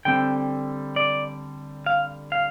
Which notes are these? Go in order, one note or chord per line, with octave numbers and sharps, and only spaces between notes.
D3 G3 C4 G5
D5
F5
F5